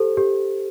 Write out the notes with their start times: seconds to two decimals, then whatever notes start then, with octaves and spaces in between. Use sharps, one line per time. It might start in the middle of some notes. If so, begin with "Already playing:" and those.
Already playing: G4 A4 C5
0.17 G4